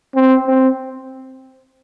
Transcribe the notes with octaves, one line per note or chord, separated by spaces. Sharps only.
C4
C4